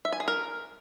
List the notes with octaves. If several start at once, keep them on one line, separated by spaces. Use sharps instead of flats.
E5
G#5
G#4
A#4